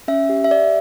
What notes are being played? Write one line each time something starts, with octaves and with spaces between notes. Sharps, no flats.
C#4 E5
G4
E5
G4 D5